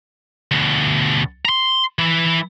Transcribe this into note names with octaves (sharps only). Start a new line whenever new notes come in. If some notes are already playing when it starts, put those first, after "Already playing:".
D2 B2
A#5 C6
E3 E4